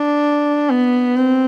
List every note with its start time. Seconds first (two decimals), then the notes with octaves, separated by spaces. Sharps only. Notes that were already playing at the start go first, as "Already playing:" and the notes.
Already playing: D4
0.70 B3
1.17 C4